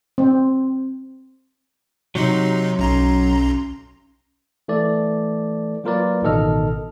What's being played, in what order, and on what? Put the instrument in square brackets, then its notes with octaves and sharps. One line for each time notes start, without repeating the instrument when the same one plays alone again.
[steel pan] C4
[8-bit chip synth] C3 D#4 C6 [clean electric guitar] F#3
[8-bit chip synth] B1 A#5 C6 [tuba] C#4
[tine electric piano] E3 A3 A4 D5
F#3 A#3 F4 A#4 B4 D5
A1 B2 D#3 A4 D#5 F6